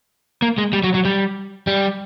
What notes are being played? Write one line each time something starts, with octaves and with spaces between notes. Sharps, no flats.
A#3
G#3
G3
F#3
F#3
G3
G3